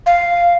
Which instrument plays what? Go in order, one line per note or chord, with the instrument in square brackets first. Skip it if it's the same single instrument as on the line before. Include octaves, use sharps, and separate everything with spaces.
[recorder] F5